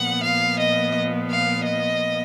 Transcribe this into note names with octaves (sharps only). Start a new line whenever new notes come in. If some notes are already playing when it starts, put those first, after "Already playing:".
Already playing: A#2 F3 B3 F#5
F5
D#5
F5
D#5